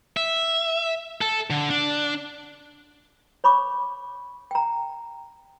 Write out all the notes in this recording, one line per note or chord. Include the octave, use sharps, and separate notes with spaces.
E5
A4
D3
D4
C#5 B5 C#6 D6
G5 A#5